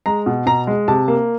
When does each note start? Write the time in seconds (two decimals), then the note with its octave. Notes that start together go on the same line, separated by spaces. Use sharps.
0.06 G#3 A#5
0.26 B2
0.46 B2 A#5
0.67 G#3
0.88 C3 A5
1.08 A#3